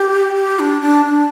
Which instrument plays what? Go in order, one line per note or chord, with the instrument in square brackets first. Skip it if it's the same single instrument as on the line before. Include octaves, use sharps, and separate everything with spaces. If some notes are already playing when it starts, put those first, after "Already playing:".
Already playing: [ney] G4
G4
D4
D4
D4